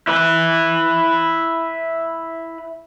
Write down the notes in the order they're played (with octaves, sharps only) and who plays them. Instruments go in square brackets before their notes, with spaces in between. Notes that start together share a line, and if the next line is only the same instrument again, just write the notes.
[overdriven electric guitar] E4 B4